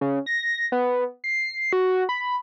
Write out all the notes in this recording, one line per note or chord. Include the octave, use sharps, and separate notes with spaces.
C#3
A#6
B3
C7
F#4
B5